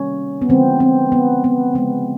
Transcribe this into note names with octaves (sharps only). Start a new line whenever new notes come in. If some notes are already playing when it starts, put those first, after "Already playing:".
Already playing: C3 D#3 G3 A#3 C#4
B3
D3 F3 G#3 C4
C4
B3
B3
C#3 F3 G#3 B3